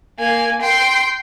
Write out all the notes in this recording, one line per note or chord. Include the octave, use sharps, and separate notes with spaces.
A#3 G#5
G5 C6